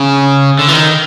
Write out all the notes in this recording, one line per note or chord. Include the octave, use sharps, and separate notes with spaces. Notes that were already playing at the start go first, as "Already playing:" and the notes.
Already playing: C#3
D3
E3
D#3